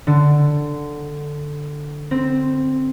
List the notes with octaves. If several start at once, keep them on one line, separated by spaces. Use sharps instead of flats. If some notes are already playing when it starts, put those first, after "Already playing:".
D3
C4